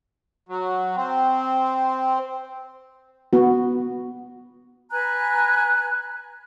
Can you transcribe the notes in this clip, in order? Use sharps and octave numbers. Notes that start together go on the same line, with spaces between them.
F#3
C4
B3 F#4
B4 G#5 A#5 F#6